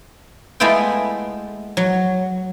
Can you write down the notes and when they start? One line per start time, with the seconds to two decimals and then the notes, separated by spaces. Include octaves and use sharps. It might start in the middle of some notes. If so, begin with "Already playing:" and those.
0.60 G#3 A3 B3 E4 F4 G5
1.77 F#3